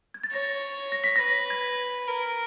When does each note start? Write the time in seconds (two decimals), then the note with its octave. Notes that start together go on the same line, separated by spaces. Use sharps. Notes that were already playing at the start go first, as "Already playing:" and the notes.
0.14 G#6
0.23 A6
0.33 C#5 A#6
0.92 A#6
1.04 B6
1.16 B4 A#6
1.50 G#6
2.08 A#4